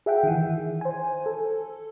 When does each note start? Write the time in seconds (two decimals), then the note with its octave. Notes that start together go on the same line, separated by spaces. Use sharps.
0.06 G#4 E5 F#5 G5
0.23 D#3 E3
0.81 C5 G#5
1.26 A4